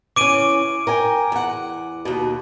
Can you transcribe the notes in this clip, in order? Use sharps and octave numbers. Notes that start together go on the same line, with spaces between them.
E3 C#4 D6 D7 D#7
A#4 G5 G#5
E2 F#5
D#2 B2